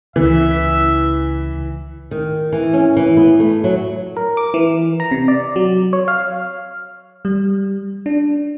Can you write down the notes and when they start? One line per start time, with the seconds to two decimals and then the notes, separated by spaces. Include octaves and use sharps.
0.16 C#2 C#3 E3 E5
2.11 D#3
2.53 E3
2.73 C#4
2.97 E3
3.17 B3
3.40 A3
3.64 F#3
4.17 A#4
4.37 D6
4.54 E3
5.00 A#5
5.11 C3
5.28 D5
5.56 F#3
5.93 C#5
6.08 F5
7.25 G3
8.06 D4